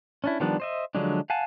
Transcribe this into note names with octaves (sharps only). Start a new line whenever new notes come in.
C#4 D4 E4
D#3 F3 G3 B3 D4
C5 D#5 E5
D3 F3 F#3 G#3 D4
F5 F#5 G#5 A5